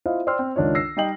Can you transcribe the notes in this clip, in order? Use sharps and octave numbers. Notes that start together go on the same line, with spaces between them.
E4 F4 C5 D#5 F5
C5 D5 G5 C6 E6 F6
C4
C#2 D#3 D4 F4 C#5
E6 A#6 C7
G3 D#4 D#5 G5 F#7